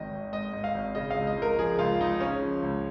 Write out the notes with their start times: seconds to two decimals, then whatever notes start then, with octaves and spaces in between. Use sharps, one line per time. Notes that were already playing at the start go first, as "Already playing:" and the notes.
Already playing: G#1 D#3 D#5
0.11 G#1
0.32 G#2 D#5
0.53 G#2
0.64 F5
0.74 G#1
0.95 C#3 D#5
1.10 F5
1.16 C#2
1.27 D#5
1.37 C#2
1.42 A#4
1.59 F3 G#4
1.79 C#2 F4
2.00 C#2 D#4
2.20 C#3 C#4
2.42 F3
2.63 C#2